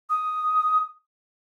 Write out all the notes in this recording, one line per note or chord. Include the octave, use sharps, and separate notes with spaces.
D#6